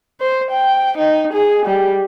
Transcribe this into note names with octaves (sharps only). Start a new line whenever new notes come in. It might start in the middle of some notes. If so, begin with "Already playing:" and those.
C5
G5
D#4
G#4
G3